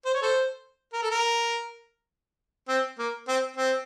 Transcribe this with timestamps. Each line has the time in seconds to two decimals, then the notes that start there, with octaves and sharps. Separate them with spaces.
0.05 C5
0.14 C#5
0.22 A4 C5
0.93 A#4
1.02 A4
1.11 A#4
2.69 C4
2.99 A#3
3.28 C4
3.57 C4